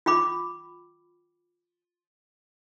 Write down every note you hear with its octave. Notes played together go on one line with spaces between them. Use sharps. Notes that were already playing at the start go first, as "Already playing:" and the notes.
F4 G5 B5 D6